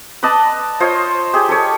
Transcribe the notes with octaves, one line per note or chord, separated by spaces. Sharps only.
B4 D5 D#5 A5
F4 C5 C#5 D#5
G4 G#4 D#5
A4 C#5